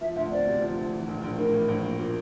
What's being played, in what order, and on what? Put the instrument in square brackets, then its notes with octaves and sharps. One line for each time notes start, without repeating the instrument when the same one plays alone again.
[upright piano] F3 [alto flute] E5
[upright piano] D2 [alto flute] E5
[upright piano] C4 [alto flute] D5
[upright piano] C3
F3
D2
E3
A#1
A#1
[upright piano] A2 [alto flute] A#4
[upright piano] E3
A#1
A#3
A#2